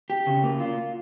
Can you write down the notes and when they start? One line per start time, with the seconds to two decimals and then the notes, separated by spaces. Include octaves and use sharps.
0.10 G4
0.27 C#3
0.43 A#3
0.60 F4